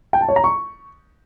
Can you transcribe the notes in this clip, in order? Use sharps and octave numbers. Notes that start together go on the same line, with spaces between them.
G5
A5
C#5
A#5
C#6